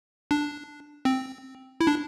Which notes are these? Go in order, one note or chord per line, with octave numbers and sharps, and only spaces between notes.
D4
C4
E4
D4